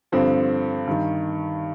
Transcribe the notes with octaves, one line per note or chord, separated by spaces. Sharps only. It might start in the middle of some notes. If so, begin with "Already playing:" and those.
G2 D3 F3 C4
G2 D#3